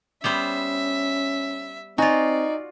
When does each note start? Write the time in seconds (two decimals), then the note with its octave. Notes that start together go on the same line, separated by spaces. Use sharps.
0.24 G3 B3 C#4 C5 E5
1.98 C4 D#4 F4 F#4 D5 G#5